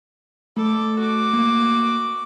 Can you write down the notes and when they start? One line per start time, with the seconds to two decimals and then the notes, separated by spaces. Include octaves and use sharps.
0.57 A3 A4 D6
0.99 F#4 D6
1.33 A#3